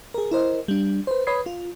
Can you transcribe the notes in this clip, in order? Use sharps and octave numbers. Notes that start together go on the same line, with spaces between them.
G#4 A#4
E4 A#4 C5 D#5
G3 D4
B4 C5
B4 C#5 B5 D#6 G#6 C7
F4